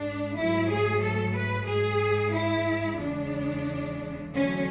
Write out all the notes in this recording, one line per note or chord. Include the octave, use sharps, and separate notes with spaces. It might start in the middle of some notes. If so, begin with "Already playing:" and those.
Already playing: G#2 G#3 D4
G#2 F#3 A3 E4
G#4
A4
B4
G#2 G#3 G#4
E4
E2 C#3 G#3 D4
E2 D3 F#3 A3 C#4